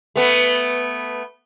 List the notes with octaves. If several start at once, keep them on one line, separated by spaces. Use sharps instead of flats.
A3 B3